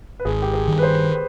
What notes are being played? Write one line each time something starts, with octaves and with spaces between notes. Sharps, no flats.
B4
G#1 G#4
G4
G#4
G2 D#3
B4
C5
B4